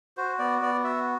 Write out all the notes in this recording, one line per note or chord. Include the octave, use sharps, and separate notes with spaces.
F#4 C5
B3 D5
B3 D5
F#4 E5